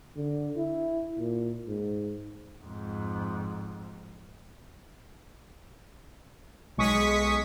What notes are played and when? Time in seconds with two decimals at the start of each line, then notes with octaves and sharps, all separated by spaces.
0.17 D3
0.57 E4
1.18 A#2
1.68 G#2
2.64 F2 G#2
6.78 B1 G#3 C#6 D#6 B6